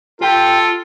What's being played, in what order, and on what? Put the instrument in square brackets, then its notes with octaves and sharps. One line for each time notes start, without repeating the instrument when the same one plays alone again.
[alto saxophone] F4 [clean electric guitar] G4 G5 [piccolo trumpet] A4